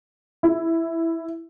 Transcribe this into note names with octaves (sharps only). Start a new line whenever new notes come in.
E4